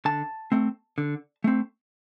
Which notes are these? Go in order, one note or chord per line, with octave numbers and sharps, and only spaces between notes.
D3 A5
A3 C4
D3
A3 C4